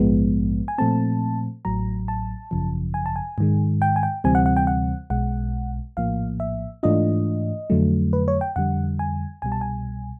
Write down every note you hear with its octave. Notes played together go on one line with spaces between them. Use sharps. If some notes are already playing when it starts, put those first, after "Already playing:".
Already playing: A#1 G#2 F3 G#3 B3
G#5
A#2 F3 A3 C4 A5
A1 A2 F#3 A#5
A5
G#1 F#2 C#3 F3
G#5
A5
G#5
G#2 D#3 G#3
G5
G#5
G5
D2 C3 E3 G3 C4 G#5
F#5
F#5
G5
F#5
B1 B2 G#3 F#5
A#1 A2 F3 A#3 F5
E5
G#2 E3 A3 D4 F4 D#5
F2 D3 F#3 A3
B4
C#5
G5
F2 D3 G3 F#5
G#5
C2 B2 G3 G#5
A5
G#5